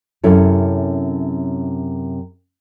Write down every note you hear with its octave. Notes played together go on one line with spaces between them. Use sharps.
F#2 C3 C#4 E4 A4